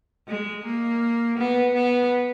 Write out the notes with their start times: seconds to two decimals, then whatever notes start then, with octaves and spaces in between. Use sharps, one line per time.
0.28 G#3
0.66 A#3
1.38 B3
1.74 B3